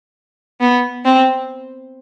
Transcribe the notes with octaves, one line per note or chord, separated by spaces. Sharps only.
B3
C4